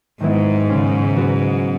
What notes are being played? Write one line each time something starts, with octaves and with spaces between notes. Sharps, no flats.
G#2 D#3 F#3 B3 E4
C#3 G#3 C#4 G#4
F#3 B3 F#4